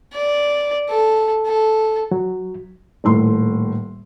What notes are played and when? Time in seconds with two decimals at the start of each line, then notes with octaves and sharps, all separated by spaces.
0.14 D5
0.90 A4
1.46 A4
2.11 F#3
3.04 D#1 A2 C6